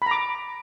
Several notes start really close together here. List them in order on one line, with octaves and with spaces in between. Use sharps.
B5 A#5 D6